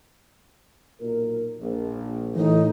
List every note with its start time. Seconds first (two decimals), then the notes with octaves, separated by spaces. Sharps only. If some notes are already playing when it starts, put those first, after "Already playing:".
1.00 B1 A#2 A#4
1.60 A#1
2.36 A2 E3 D#4